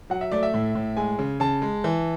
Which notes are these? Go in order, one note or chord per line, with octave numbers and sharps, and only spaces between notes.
F#3 F#5
E5
A3 D5
E5
A2
A2
G#3 G#5
C#3
C#3 A5
G#3
E3